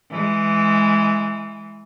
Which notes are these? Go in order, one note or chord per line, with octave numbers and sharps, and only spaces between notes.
E3 G#3